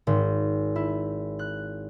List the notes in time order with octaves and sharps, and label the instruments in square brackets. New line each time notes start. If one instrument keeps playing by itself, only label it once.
[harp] G#1
E4
F#6